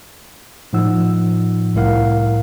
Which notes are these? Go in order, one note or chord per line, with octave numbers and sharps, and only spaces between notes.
A2 F3 D#4 F#5 E6
C2 A2 E4 A#4 F5 F#5